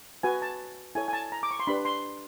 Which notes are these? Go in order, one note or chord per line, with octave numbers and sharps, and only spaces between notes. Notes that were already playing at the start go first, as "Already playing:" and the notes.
F#4 B4 G#5
A5
E4 A4 C#5 G#5
G#5
A5
A#5
D6
C#6
C6
D4 G4 B4 B5
C6